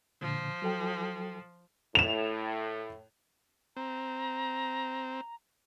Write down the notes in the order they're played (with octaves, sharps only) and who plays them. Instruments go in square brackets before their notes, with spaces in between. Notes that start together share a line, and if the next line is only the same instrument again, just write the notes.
[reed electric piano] A#2 D3 [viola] F3
[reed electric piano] F#3 A4 G5
[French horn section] A2 [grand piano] E7 F7
[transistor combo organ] C4 [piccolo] A#5